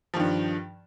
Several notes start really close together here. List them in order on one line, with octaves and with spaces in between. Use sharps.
F3 D#3 G2